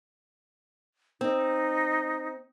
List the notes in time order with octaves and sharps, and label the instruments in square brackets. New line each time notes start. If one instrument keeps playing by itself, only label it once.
[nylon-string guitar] C4 [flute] D#4